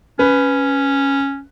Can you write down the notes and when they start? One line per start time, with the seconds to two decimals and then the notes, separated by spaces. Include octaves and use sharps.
0.19 C#4 B4